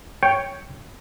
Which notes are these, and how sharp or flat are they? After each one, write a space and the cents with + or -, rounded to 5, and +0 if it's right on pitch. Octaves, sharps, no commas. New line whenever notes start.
C#5 +0 G5 +0